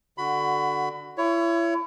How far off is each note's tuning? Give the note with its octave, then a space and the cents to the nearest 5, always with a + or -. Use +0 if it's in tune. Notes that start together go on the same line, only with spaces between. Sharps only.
D3 +0 F#4 +0 B5 +25
E4 +35 C#5 +20